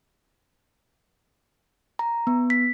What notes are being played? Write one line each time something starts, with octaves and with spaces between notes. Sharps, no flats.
A#5
B3
B6